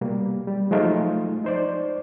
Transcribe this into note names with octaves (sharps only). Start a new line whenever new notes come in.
B2 G3 A#3
G3
F3 F#3 G#3 A3 D#4 F4
D#4 C5 D5